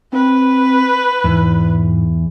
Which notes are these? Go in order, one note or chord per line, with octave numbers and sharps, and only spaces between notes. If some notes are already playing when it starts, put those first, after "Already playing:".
C4 B4
E2 G#2